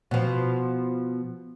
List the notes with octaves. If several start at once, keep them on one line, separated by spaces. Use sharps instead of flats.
B2 F3